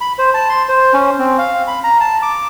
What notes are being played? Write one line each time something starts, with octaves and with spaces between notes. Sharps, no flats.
B5
C5
A5
C6
C5
C#4
C4
F5
B5
A#5
A5
D6